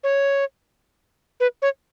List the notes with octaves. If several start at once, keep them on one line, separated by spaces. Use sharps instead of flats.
C#5
B4
C#5